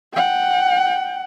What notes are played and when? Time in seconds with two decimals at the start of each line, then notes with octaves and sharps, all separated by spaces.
0.13 F#5 G5